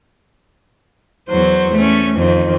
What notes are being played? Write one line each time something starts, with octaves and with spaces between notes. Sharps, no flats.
E2 F#3 C5
A3 C#4
F2 D#3 C4